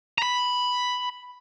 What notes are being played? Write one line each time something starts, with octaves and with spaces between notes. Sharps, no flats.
A#5 B5